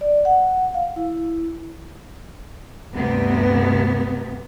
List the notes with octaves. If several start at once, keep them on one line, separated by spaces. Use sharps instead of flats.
D5
F#5
F5
E4
D2 G2 C3 B3